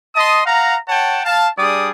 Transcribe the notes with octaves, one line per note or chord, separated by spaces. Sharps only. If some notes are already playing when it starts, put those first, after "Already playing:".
D#5 A5 C6 D#6
F5 F#5 A#5
C#5 F#5 G5 A5
F5 A5
G3 D4 G#4 D5 D#6